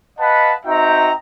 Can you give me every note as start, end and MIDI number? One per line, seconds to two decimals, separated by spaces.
0.19 0.53 71
0.19 0.53 75
0.19 0.53 77
0.19 0.53 78
0.19 0.53 81
0.19 0.53 83
0.66 1.11 60
0.66 1.11 63
0.66 1.11 66
0.66 1.11 76
0.66 1.11 79
0.66 1.11 82